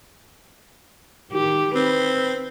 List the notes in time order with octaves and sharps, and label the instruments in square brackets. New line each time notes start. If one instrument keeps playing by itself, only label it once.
[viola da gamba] D#3 G4
[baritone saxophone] C4 [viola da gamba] B4